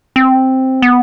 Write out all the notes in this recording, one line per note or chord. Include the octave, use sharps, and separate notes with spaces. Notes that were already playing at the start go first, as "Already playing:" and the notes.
C4
B3